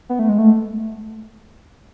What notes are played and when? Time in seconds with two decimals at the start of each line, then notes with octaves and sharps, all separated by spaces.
0.09 B3
0.19 A3
0.29 G#3
0.39 A3